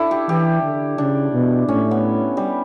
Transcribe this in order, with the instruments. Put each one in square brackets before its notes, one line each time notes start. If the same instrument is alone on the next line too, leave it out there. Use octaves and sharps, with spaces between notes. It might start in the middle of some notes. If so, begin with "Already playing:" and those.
Already playing: [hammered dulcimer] D4 E4 A4
G4
[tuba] E3 [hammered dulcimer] G4
[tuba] D3
[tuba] C#3 [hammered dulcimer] D4
[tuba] B2
[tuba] A2 [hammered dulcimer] C#4
[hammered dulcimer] B3
G3